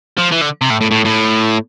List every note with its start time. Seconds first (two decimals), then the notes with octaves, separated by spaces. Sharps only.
0.17 F3
0.31 E3
0.41 D3
0.61 C3
0.70 A2
0.81 A2
0.91 A2
1.05 A2